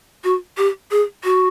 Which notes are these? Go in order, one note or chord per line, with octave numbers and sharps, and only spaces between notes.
F#4
G4
G#4
F#4